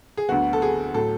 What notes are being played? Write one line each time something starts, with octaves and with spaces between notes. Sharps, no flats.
G#4
D2 D3 F#3 B3 F#4
A4
G#4
A2 F#3 A4